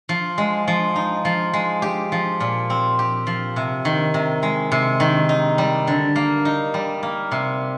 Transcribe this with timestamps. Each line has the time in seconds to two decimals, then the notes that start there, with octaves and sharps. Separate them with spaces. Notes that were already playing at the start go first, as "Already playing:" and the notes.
0.09 F3
0.38 G#3
0.68 F3
0.96 D#4
1.25 F3
1.54 G#3
1.82 G4
2.12 F3
2.40 A#2
2.70 C4
2.99 G4
3.27 F3
3.56 C3
3.85 D#3
4.14 C3
4.43 G#3
4.72 C3
5.00 D#3
5.29 D#4
5.58 G3
5.87 D3
6.16 A#3
6.45 D#4
6.74 G3
7.03 A#3
7.32 C3